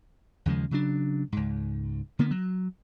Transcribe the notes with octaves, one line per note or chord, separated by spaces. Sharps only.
D#2 C#3 F3 G#3
C#3 F#3 D4
C#2 G#2
D3 A#3 B3
F#3